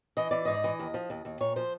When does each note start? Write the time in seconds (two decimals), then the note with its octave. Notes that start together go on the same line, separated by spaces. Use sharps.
0.17 E3 D#5
0.31 E3 D5
0.45 G#2 D#5
0.64 E3
0.79 D#2
0.94 F3
1.10 D#2
1.25 D#2
1.41 A#2 C#5
1.56 F3 C5